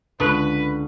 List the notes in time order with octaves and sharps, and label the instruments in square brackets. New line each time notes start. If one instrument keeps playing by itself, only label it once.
[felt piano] C#2 C#6 D#6 [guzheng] D3 [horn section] B4